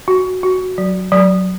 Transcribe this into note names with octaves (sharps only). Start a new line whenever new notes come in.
F#4
F#4
F#3
F#3